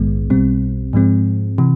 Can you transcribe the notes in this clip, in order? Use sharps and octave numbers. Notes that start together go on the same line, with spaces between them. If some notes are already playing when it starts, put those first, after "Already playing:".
Already playing: A#1 G#2 D#3 G#3 B3
B1 B2 G3 C4
G#2 F3 G#3 C4
C3 E3